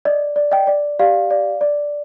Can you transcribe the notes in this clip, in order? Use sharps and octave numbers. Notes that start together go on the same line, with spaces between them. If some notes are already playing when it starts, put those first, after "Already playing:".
D5 D#5
D5
D#5 G5
D5
G4 D5 F5
D5
D5